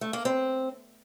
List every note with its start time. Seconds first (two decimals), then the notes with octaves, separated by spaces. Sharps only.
0.01 A3
0.13 A#3
0.25 C4